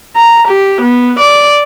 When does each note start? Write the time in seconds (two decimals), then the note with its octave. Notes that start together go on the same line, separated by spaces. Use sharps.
0.16 A#5
0.48 G4
0.82 B3
1.19 D5